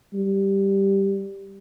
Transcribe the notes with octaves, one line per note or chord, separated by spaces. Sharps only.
G3